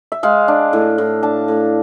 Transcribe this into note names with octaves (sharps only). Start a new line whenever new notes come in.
E5
G#3 F5
D4
A2
A2
D4 A5
A2